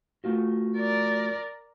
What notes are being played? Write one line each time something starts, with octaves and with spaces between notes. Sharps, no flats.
A3 F4 F#4
A#4 D5